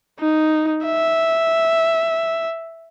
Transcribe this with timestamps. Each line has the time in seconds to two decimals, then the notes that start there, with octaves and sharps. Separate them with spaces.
0.20 D#4
0.86 E5